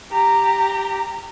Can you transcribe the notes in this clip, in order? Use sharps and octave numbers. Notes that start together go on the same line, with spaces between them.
G4 A#5